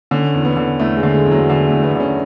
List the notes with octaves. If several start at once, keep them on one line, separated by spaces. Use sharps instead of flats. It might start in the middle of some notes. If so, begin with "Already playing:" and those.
D3 C#4
E2
B3
D3
E2 A3
G#3
D3
G#3
E2
F#3
D3 G#3
E2 A3
B3
D3 C#4